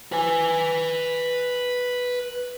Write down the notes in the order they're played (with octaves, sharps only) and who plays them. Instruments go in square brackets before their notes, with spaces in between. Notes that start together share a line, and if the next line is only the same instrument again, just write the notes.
[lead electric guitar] B4 G#5